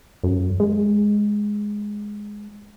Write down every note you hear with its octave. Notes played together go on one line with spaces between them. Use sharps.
F#2
G#3